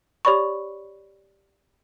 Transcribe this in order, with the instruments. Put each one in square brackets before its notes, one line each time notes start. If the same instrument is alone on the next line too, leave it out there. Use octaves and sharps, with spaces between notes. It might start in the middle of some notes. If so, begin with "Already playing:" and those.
[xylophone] G4 C#5 D5 B5 C#6